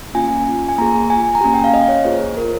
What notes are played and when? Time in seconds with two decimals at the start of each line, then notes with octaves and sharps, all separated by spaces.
0.14 A#3 C#4 F4 G#5
0.68 G#5
0.78 A#3 F4 G#4 A#5
1.10 G#5
1.35 A#5
1.41 A#3 C#4 G4 G#5
1.54 G5
1.64 F5
1.74 D#5
1.88 C#5
2.04 A#3 F4 G#4 C5
2.37 A#4